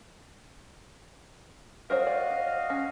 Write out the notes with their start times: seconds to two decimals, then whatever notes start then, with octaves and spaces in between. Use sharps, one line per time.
1.90 F#4 A#4 C5 C#5 D#5 F5
2.07 D5
2.70 C#4